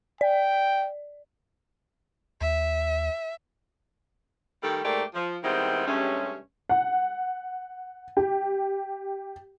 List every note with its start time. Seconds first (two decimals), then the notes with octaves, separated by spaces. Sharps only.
0.21 D5 G5
2.41 D#2 E5
4.63 D#3 G3 A3 G4 A4
4.84 G#2 A3 A#3 G4 D5
5.14 F3
5.44 D#3 G3 G#3 B3 C4 E4
5.86 G2 C3 G#3 A3 C#4
6.69 F#5
8.17 G4